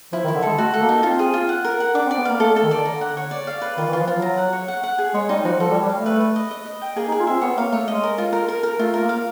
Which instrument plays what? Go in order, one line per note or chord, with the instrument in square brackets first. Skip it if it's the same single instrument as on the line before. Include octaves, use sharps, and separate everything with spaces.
[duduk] F3 [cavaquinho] E4
[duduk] D#3
[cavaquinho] E4
[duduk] D3
[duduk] G#3 [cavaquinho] A4
[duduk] A3 [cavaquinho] F#4
[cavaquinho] A4
[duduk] A#3
[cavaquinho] D#4
[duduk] C4 [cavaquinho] F4
[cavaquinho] G#4
F4
F#5
A#4
F#5
[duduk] D4 [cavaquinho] D6
[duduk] C4
[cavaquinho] D5
[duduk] B3
[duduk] A#3 [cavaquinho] F5
[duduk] A3 [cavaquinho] A4
[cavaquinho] A4
[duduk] D#3
[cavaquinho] D5
[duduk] D3 [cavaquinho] A#5
[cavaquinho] F#5
C#5
D5
F5
B4
[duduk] D#3 [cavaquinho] F4
[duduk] E3
[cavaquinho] F4
[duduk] F3
[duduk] F#3 [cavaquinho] F4
[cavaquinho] A#5
F#5
C#5
F#5
F#5
G#4
[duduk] G#3 [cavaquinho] C#5
[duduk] G3 [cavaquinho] D#4
[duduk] F3 [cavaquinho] F#4
[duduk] F3 [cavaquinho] A4
[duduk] G3
[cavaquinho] C#5
[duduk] G3
[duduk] A3 [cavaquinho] F5
[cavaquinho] B4
B4
D#5
D#5
D#5
G5
[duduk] A#3 [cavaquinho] G#4
[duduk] D#4
[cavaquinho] G#4
[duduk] F4
[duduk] C4 [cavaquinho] E5
[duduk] B3 [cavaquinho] C#5
[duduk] A#3 [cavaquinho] F5
[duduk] A3 [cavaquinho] C#5
[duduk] G#3 [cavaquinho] D#5
[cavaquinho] A#4
F4
A#4
A#4
A#4
[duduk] A3 [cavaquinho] F4
[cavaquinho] A#4
[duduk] A#3
[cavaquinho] F5